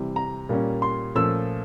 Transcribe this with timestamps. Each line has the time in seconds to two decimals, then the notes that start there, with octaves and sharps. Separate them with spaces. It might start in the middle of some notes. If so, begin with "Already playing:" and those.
Already playing: C3 E3 G3
0.16 A#5
0.49 A#2 G3 A#3 C#4
0.82 C6
1.15 A#2 F3 A3 C#4 E6